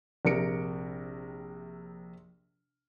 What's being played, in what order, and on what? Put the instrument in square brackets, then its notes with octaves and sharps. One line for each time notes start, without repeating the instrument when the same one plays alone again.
[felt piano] A#1 C3 A#4 C#7 D7